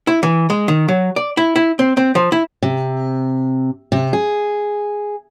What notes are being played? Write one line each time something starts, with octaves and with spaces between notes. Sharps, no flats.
E4
E3
G#3
D#3
F#3
D5
E4
E4
C4
C4
F3
E4
C3
C3
G#4